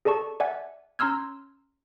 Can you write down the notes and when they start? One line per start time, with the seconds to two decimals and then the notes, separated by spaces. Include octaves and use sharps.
0.05 G#4 A4 D5 A5 C#6
0.40 D5 E5 F#5 G#5
0.99 C#4 A#5 C6 E6 F6 G#6